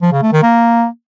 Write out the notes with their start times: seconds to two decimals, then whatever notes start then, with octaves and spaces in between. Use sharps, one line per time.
0.02 F3
0.12 C#3
0.23 A3
0.33 D#3
0.43 A#3